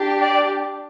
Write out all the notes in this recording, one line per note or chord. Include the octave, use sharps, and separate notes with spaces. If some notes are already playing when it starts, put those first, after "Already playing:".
Already playing: D4 G4
D5